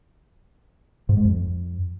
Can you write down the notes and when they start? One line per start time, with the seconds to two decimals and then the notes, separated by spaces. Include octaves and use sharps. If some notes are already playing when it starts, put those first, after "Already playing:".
1.09 G#2
1.17 G#3
1.25 F2